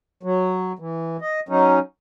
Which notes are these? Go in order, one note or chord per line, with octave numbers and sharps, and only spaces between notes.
F#3
E3
D#5
F#3 C#4 D#4